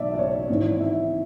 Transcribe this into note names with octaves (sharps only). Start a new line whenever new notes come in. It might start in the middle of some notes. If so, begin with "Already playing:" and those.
Already playing: B1 A2 E3 D5 E5
D5
C#5
G#1 G#2 E3 C#5
E5